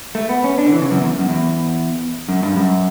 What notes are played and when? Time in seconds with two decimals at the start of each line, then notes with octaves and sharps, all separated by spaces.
0.15 A3
0.29 B3
0.44 C#4
0.58 D4
0.66 D3
0.72 E3
0.82 C#3
0.91 F#2
1.01 E2
1.19 F#2
1.29 E2
2.29 F#2
2.42 G2
2.56 F#2